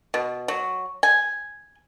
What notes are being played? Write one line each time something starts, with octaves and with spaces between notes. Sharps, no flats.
B2
F#3
G#5